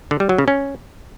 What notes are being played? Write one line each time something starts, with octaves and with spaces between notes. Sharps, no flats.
D3
G3
F#3
C#3
C#4